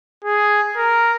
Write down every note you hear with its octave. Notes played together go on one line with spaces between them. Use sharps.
G#4
A#4